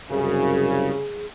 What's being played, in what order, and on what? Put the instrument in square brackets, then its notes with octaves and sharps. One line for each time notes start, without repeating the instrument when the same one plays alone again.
[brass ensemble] C2 F#2 [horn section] C#3 [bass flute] G#4